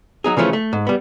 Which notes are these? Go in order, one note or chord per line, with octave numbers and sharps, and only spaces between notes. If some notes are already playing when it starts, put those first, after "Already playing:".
F#3 D#4 G#4
C#3 E3 F3 A3 C#4
A3
G#2
G3 B3